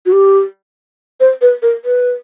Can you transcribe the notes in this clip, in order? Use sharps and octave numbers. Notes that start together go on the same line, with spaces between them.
F#4
G4
C5
B4
A#4
B4